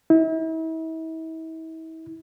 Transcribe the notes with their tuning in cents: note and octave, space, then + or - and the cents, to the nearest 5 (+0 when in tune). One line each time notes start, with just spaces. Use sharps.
E4 -40